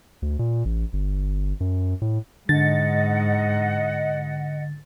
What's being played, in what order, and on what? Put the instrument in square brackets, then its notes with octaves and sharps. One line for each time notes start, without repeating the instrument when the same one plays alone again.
[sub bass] D2
A#2
A1
G1
F#2
A2
[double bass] G#2 [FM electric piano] D3 A6 [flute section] D#5 F#5